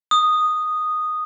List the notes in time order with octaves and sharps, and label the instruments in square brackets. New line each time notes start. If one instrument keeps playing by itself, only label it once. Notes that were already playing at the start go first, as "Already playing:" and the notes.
[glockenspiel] D#6